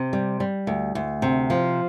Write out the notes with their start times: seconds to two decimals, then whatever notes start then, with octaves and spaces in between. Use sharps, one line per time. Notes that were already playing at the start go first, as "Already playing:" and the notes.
Already playing: C3
0.13 G3
0.40 G3
0.67 D2
0.95 D2
1.22 C3
1.50 F3